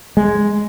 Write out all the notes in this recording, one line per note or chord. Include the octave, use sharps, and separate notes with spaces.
G#3